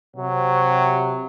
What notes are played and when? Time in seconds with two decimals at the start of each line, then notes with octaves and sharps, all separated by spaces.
0.16 C3 F#3